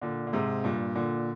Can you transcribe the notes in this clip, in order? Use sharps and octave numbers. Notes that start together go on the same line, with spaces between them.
A#2 D3
D3
G#2 C3
G2 A#2
A#2 D3